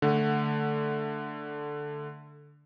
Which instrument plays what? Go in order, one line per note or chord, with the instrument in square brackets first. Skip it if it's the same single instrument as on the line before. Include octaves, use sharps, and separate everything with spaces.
[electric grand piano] D3 A3 F#5